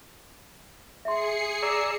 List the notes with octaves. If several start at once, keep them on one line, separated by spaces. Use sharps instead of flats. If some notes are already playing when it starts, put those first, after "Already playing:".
G#4 E5 C6 C7 C#7
D5 A#5 E6